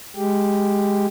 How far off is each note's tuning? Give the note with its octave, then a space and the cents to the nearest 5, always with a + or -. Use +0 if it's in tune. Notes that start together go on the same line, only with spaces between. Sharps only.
G#3 +0 G4 +0